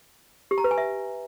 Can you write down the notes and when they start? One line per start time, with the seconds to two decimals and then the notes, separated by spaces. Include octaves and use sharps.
0.51 G4
0.58 A#5
0.64 B4
0.71 G#5
0.78 E5